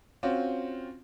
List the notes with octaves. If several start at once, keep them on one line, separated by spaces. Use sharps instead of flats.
C4 C#4 F4 F#4